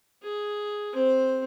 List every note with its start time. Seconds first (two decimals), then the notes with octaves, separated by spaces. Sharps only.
0.23 G#4
0.93 C4 C5